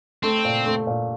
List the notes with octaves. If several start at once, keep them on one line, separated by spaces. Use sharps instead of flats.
A3 C4
A#2
A3
A#2